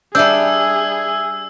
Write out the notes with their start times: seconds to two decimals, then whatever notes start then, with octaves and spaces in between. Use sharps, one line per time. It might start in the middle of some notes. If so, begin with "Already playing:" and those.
0.15 G3 D4 G#4 E5 E6 G6